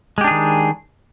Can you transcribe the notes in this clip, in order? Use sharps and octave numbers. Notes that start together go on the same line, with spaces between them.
D#3 G#3 D4 G4 G#4